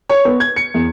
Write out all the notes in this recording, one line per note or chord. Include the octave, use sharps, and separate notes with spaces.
C#5
B3
G#6
C#7
E2